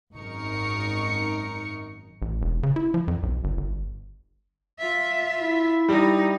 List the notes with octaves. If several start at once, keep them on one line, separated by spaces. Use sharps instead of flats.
G#1 F#2 D#4 A#4 C#6 C#7
A1
E1
C#3
E4
F3
F2
B1
G1
G1
F4 E5
E4
G3 D#4